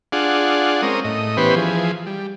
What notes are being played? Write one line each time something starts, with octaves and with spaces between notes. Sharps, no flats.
D4 F4 G#4 F#5
G#3 C4 C#4 A#4 D#6
A2 D#5
E3 B3 C#4 G4 B4 C5
E3 F3 G#4
G3